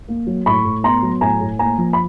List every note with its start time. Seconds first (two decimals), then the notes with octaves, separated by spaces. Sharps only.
0.08 A#3
0.27 F#3
0.46 A2 B5 C#6
0.65 A2
0.83 B3 A#5 C6
1.02 F#3
1.21 A2 G#5 A#5
1.41 A2
1.59 A#3 G#5 A#5
1.78 F3
1.93 B5